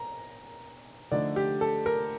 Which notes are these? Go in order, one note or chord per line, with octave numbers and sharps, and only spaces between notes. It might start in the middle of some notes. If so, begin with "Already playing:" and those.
Already playing: A#5
D3 F3 A3 D#4 D5
G4
A4
A#4